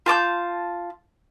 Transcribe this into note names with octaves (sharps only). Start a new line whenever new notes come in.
F4 A5 D6 G6